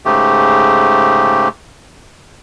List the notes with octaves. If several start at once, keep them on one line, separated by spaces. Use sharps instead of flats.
G#2 C#3 A3 G4